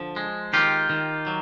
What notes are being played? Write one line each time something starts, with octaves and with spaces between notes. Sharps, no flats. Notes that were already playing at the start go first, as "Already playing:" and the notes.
Already playing: D3 F3
G#3
D#3 F4 G4
D#3
F#3